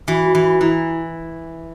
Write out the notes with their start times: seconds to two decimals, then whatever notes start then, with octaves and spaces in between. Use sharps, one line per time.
0.08 E3 F#4
0.26 F#4
0.35 E3
0.43 F#4
0.61 E3 E4